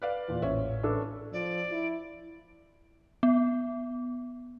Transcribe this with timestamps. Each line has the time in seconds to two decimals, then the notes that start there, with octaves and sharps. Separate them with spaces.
0.02 B4 D5 F5
0.28 E2 A#2
0.42 A1 C#4 E5
0.83 D4 A4 B4
1.33 F3 D5
1.71 E4
3.23 B3